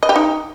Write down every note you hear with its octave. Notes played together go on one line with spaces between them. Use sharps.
D#5
G4
D#4